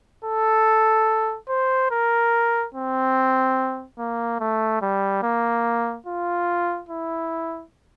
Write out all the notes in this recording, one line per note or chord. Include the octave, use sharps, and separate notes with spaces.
A4
C5
A#4
C4
A#3
A3
G3
A#3
F4
E4